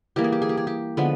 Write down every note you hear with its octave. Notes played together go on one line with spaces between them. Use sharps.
E3 G3 A#3 G4
G#4
G4
G#4
G4
G#4
G4
D3 F3 G#3 B3 B4